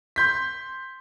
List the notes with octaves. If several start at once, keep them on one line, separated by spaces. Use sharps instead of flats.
C6 G6 B6